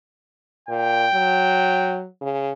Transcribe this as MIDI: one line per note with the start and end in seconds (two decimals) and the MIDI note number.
0.69 1.06 46
0.69 2.00 79
1.14 2.06 54
2.22 2.52 49